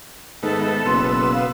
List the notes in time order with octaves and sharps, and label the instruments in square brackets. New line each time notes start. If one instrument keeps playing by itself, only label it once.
[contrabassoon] G#2 [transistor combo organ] D#3 A3 B3 [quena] A4
[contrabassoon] F#1 [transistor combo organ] B2 B3 E6 [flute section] C6
[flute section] F5